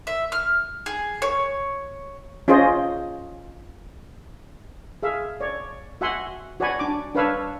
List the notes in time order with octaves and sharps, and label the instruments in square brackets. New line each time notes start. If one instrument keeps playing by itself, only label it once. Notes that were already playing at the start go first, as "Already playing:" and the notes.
[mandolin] E5
F6
G#4
C#5
[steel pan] C#4 F4 G#4 C5 D#5
G#4 E5 F5
C#5 D5
F#4 E5 F#5 G#5 C6
F#4 C#5 D5 F#5 G#5 B5
D4 D6
D4 B4 C#5 F5 B5 E6